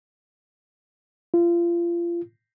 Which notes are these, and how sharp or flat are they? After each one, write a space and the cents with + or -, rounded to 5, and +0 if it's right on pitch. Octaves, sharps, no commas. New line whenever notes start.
F4 -30